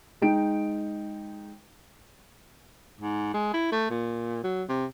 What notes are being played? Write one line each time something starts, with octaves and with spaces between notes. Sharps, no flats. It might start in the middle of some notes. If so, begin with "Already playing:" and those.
G#3 D#4 G5 D7
G#2
G#3
E4
A3
A#2
F#3
C3